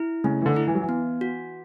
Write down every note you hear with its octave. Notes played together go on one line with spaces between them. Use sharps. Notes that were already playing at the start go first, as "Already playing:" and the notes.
Already playing: E4
C#3 A3
E3
D3
E4
E3
F#3
E3
B3
F#4